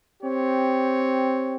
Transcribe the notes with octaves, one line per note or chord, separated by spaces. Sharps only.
C4 G4 C#5